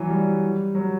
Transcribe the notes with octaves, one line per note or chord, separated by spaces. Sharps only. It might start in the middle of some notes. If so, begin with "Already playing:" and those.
Already playing: E3 F#3
G3
F#3